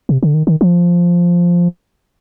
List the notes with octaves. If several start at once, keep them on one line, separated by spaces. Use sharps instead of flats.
C3
D3
D#3
D#3
F3